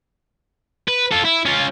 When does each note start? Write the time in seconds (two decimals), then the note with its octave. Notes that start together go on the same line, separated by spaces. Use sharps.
0.88 B4
1.11 F4 A4
1.25 E4
1.45 C#4 F4